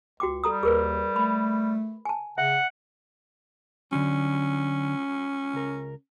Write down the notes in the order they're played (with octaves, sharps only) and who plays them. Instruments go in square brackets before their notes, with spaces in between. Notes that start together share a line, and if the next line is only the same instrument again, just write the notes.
[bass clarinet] C#2 [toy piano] F#4 G5 D6
[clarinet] G3 [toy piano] A4 A#5 D#6
[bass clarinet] D#2 [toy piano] G#4 A#4 B4
[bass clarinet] A3 [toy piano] B5
[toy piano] G#5 A5
[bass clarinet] C#3 [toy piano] E5 [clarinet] F#5
[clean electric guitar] D3 F#3 [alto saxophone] C#4
[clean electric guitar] C#2 A#4